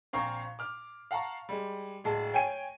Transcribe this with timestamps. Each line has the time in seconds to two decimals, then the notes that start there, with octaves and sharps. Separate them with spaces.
0.13 A#1 C4 F5 A#5 C#6
0.59 D6 F6
1.11 F5 F#5 A5 A#5 C#6
1.49 G3 G#3
2.04 D1 G#3 A5
2.33 C#5 G5 G#5 D#7